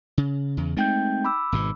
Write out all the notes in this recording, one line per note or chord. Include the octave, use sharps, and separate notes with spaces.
C#3
E2 C#3
G#3 A3 C4 D#4 G5 G6
B5 D6 E6
G#1 G#2 B2